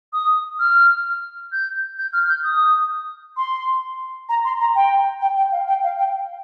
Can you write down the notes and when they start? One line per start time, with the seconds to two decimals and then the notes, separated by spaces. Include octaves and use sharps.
0.13 D#6
0.59 F6
1.52 G6
1.98 G6
2.13 F6
2.28 G6
2.44 D#6
3.37 C6
4.29 A#5
4.44 C6
4.60 A#5
4.75 G5
5.21 G5
5.37 G5
5.52 F5
5.68 G5
5.83 F5
5.98 G5